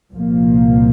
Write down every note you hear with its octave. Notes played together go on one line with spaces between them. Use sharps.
C2 A#2 F3 A#3